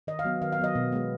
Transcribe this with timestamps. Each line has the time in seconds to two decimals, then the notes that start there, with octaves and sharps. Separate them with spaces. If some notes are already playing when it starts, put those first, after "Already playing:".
0.07 D#3 D#5
0.19 F5
0.24 F#3 B3
0.42 D#3 F5
0.52 F5
0.59 F#3 B3 D#5
0.75 B2
0.92 G#3 B3